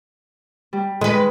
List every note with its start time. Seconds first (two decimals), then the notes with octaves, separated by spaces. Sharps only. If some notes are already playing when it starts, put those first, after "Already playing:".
0.73 G3
1.01 D#3 G#3 B4